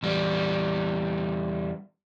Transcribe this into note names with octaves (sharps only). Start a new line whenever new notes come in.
E2 G3